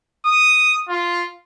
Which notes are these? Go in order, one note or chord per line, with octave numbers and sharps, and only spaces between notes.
D#6
F4